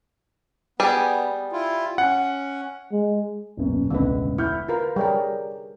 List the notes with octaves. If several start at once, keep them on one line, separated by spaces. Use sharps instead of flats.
G3 B3 G4 G#4
E4 F4
C#4 F#5
G#3
D#1 F#2 B2
E1 C#2 A2 D3 B4
E4 F6 G6
F4 A#4 B4
G3 G#4 A#4 C#5 D5 G5